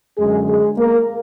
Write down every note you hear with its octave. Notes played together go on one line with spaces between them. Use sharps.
F#2 D3 G#3 G#4
G#3 G#4
A#3 A#4